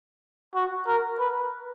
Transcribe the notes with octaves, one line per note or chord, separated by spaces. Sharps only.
F#4
A#4
B4